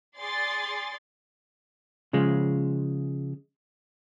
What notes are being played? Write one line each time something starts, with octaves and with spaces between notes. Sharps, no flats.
G#4 D5 C6 A6
C#3 F3 G#3